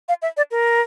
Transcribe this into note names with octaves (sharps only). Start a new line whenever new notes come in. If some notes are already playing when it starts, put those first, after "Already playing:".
F5
E5
D5
A#4